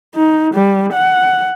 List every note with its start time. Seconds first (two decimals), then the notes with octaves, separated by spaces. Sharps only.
0.15 D#4
0.54 G3
0.93 F#5